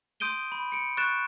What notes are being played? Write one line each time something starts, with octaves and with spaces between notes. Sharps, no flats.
C6 D#6 G6 D7 D#7 G7
B5
C#7 D7
C#6 F#6 G6 A6 D7 E7